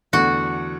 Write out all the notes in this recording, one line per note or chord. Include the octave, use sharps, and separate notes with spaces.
E2 D3 A3 D4 F#4